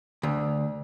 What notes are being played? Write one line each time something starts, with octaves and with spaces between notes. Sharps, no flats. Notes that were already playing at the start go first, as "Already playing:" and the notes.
D2